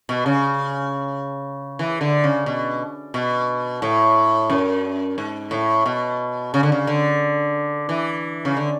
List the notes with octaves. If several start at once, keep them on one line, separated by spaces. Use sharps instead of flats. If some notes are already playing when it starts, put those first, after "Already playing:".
B2
C#3
E3
D3
C#3
B2
B2
A2
F#2
G#2
A2
B2
C#3
D3
C#3
D3
E3
C#3
D3